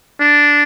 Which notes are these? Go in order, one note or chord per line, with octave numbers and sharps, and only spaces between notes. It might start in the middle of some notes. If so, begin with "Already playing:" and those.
D4